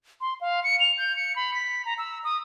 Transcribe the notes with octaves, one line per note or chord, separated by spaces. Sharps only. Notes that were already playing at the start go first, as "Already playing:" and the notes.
C6
F5
C#7
F7
G6
C#7
B5
B6
A#5
E6
D#6